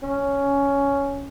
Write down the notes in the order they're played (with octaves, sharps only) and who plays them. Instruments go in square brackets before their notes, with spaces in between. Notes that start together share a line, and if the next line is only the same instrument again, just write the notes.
[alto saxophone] C#4